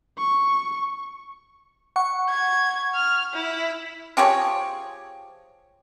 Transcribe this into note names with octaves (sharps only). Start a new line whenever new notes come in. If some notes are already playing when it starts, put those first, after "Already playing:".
C#6
F#5 C#6
G#6
F6
E4
F3 G4 G#4 C#5